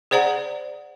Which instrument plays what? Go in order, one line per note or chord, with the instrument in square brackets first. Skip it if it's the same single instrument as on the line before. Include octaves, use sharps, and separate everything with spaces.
[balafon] G#4 C5 D5 F#5 A#5